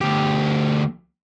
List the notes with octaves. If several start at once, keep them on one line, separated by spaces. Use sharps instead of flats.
D2 G4